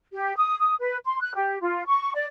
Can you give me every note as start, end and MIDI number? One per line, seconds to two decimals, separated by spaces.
0.13 0.36 67
0.37 0.59 87
0.59 0.76 87
0.81 0.98 71
1.06 1.21 84
1.21 1.33 90
1.35 1.57 67
1.62 1.86 65
1.87 2.13 85
2.15 2.26 74